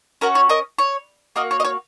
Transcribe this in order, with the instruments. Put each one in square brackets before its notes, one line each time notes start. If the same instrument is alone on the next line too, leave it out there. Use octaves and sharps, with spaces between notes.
[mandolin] C#4 F#4 A#4
C#5
A#4 D#5
C#5
A#3 F#4 A#4 D#5
C#5
D#5
C#5